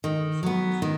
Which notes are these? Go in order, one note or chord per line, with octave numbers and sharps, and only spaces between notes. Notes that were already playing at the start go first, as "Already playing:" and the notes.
D#3
F#3 B3
D#3